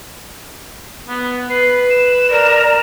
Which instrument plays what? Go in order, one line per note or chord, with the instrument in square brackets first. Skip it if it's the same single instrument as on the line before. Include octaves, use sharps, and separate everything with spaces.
[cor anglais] B3
[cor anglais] B4 [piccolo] C7
[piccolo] E7
[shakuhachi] A#4 [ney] D5